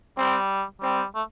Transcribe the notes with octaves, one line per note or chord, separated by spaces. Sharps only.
G3 C4
G3 C4
A3